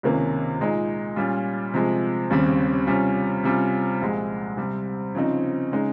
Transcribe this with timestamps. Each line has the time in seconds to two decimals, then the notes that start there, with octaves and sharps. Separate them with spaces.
0.03 C#2 C3 D#3 A#3 C#4
0.60 A#2 G#3 D#4
1.16 A#2 G3 C#4 F4
1.74 C3 F3 G#3
2.30 D#2 C#3 G3 C4
2.87 C3 G3 C#4 F4
3.44 C3 G3 C#4 F4
4.01 C2 A#2 F3 G#3
4.57 C3 G3 C4
5.15 C#3 F3 C4 D#4
5.71 C#3 G#3 D#4